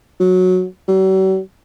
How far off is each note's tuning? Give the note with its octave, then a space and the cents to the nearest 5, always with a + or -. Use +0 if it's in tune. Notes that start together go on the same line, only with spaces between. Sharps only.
F#3 -10
F#3 +45